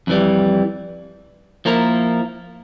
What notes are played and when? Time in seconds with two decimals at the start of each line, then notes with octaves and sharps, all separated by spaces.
0.07 F2 E3 G3
1.65 F3 A#3 E4 A#4